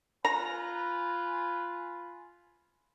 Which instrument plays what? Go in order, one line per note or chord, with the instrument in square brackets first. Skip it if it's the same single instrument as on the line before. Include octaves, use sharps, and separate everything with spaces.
[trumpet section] F4 B4 G#5 [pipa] A#5